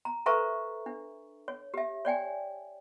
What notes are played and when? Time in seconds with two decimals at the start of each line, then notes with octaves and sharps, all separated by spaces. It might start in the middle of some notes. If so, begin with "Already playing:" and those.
0.05 A#5
0.26 A4 B4 C5 E5 A#5 C#6
0.86 D4
1.48 C#5
1.74 G4 E5
2.05 C#5 D5 G5 G#5